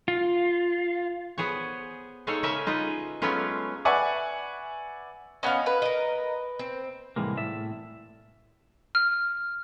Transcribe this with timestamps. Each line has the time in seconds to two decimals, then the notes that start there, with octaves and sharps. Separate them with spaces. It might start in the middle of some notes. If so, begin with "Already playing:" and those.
0.08 F4
1.38 B3 G#4 C5 C#5
2.27 G#3 D#4 G#4 A4 C#5 F5
2.43 C#3 C#4 A#4 E5 G#5
2.67 D#4 F4 B4 D#5
3.22 F#3 G#3 A3 B3 C#4 F4
3.85 B4 D5 E5 F#5 G#5 C#6
5.43 B3 C#4 D#5 F5
5.66 B4
5.82 A#4 D#5
6.59 C4
7.16 C2 A2 E3 G#3 A#3
7.37 A2 D5 E5
8.95 F6